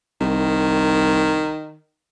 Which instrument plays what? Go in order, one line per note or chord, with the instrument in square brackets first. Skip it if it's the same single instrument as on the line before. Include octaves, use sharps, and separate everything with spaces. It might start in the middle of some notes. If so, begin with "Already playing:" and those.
[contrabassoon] C2 [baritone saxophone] D#3